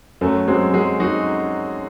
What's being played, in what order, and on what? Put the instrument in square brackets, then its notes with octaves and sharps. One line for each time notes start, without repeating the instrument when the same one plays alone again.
[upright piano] F#2 [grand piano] F#3 A3
[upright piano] F#3 [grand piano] G#3 C4
[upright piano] F#3 [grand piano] G#3 C4
[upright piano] F#3 [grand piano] D#4 F#4